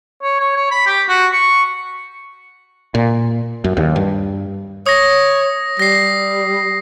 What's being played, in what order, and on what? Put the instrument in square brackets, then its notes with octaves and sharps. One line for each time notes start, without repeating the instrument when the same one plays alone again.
[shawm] C#5
C#5
C#5
B5
G4
F#4
C#6
[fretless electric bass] A#2
F#2
D#2
G2
[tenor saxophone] C#5 [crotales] D#6 A#6
[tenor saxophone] G3 [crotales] A#6 C7